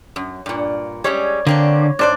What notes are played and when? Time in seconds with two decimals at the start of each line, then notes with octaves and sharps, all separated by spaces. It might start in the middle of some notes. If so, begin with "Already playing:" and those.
0.16 F#2
0.46 G2 A#2
1.04 G3 G#3 C#4 C#5
1.47 D3 A#3 C4 D4
1.99 G#2 D4 C5 D5